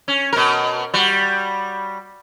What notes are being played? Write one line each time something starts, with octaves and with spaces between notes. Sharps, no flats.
C#4
B2 A#4
G3 F#4